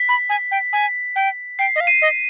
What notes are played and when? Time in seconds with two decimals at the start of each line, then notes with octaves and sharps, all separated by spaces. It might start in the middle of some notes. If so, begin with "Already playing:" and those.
Already playing: B6
0.09 B5
0.29 G#5
0.51 G5
0.73 G#5
1.16 G5
1.59 G5 C7
1.76 D#5
1.80 F5
1.87 C7 D#7
2.02 D#5